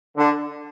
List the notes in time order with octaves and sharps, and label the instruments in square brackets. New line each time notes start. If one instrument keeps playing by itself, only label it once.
[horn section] D3